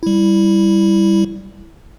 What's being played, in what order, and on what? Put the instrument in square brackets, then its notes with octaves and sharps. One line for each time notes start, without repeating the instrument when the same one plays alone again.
[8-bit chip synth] G3 E4